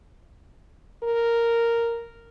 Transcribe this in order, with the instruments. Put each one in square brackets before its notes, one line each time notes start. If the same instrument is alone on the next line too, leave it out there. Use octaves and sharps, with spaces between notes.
[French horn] A#4